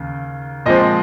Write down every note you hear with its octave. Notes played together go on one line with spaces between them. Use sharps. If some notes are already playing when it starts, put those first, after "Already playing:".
Already playing: D#2 C#3
A#2 F3 G#3 C4 D#5